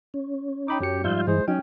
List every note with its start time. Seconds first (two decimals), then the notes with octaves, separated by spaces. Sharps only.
0.14 C#4
0.68 D#4 G5 B5 D6
0.80 F#2 F#3 C#4 G4 C#7
1.04 G#2 F3 G3 F4 E5 G6
1.27 G2 E3 G#3 E4 G#4 C5
1.48 F#3 C#4 D#4 G5